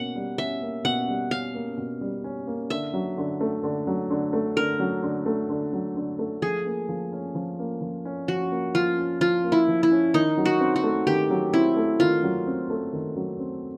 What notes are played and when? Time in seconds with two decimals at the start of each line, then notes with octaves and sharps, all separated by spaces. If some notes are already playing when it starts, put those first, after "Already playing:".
Already playing: B2 A#3 C#4 F#5
0.15 G3
0.38 C#4 E5
0.62 A#3
0.85 B2 F#5
1.08 G3
1.31 C#4 F5
1.54 A#3
1.77 B2
2.01 G3
2.24 C#4
2.47 A#3
2.70 D3 E5
2.94 F#3
3.18 D3
3.41 A3
3.63 D3
3.87 F#3
4.10 D3
4.33 A3
4.56 D3 A#4
4.80 F#3
5.03 D3
5.26 A3
5.49 D3
5.73 F#3
5.96 D3
6.19 A3
6.42 F3 G#4
6.66 A#3
6.89 F3
7.13 C#4
7.35 F3
7.59 A#3
7.81 F3
8.05 C#4
8.28 F3 F#4
8.51 A#3
8.75 F3 F4
8.98 C#4
9.21 F3 F4
9.44 A#3
9.52 E4
9.68 F3
9.83 E4
9.91 C#4
10.14 D#3 D#4
10.37 F#3
10.45 F#4
10.60 C4
10.76 F#4
10.83 A3
11.07 D#3 G4
11.30 F#3
11.53 C4 E4
11.76 A3
12.00 D#3 F4
12.23 F#3
12.47 C4
12.70 A3
12.93 D#3
13.16 F#3
13.39 C4